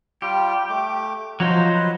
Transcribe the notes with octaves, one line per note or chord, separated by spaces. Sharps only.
G3 F4 G4
A3 D6
F3 F#3 D#4 F4 F#4 C5
B4